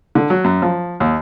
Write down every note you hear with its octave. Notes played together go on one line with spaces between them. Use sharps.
D3
F#3
F#2
F3
D#2